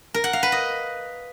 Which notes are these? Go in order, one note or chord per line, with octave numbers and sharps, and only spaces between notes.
A#4
F#5
F5
B4
D#5